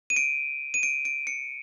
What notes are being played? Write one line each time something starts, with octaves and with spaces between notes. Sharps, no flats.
D#7
D7
D#7
D7
D7
C#7